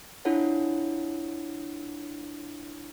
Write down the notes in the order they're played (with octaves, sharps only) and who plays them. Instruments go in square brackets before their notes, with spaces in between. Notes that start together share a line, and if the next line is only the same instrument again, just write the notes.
[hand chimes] D4 E4 F4 A4 C#5 F#5